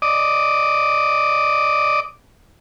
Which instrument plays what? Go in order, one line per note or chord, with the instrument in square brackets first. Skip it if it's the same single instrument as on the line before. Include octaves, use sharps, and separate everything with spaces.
[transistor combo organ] D5 D#5 D6 D#6